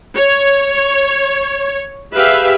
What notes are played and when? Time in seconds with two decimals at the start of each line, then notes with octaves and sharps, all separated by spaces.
0.16 C#5
2.15 G4 G#4 B4 E5 F5